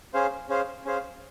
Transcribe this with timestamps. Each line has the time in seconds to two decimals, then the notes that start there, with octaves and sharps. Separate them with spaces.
0.14 C#4 G#4 C5 F5
0.49 C#4 G#4 C5 F5
0.85 C#4 G#4 C5 F5